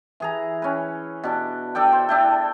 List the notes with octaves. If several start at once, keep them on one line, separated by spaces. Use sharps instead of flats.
E3 G#4 A#5
C#4 B4
B2 D4
D4 A4 D5 G5
C5
D4 E4 G5